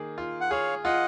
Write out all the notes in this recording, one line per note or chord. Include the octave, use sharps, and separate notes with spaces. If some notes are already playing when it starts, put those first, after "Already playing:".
Already playing: D#3 A#3 G#4
F4
F#5
G#4 C#5 F5
F4 D#5 F#5